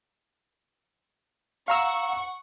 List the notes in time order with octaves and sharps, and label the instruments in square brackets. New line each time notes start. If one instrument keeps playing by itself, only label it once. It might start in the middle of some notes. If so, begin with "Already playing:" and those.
[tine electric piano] F5 A#5 E6 [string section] F#5 C#6